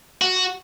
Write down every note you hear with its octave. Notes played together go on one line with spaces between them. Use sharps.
F#4